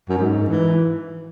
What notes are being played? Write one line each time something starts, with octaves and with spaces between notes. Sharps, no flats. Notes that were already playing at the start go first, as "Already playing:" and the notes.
F#2
G#2
E3